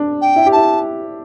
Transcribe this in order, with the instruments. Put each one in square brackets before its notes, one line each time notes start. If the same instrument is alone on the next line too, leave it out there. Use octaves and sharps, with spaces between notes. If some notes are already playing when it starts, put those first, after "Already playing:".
Already playing: [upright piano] D4
[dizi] G5
[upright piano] E4
G4
[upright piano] E4 [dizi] A5